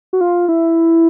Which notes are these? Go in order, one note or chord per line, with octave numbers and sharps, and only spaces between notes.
F#4
F4
E4